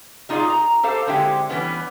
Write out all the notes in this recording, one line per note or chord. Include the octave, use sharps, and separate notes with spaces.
G3 D#4 F4 G#4 D5 F5
A#5
G4 A4 C5 F5 A5
D3 G#3 C4 E4 G4
E3 G3 B3 C#4